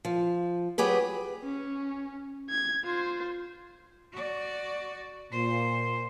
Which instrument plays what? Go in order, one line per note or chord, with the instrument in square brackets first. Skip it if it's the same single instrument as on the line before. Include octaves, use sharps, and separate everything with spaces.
[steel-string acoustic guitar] F3
F#3 G4 G#4 B4
[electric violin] C#4
G#6
F4 C5
[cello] F#4 D5
[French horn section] A#2 [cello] C5